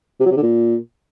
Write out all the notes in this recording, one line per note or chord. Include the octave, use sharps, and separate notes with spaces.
C3
F#3
C3
D3
A#2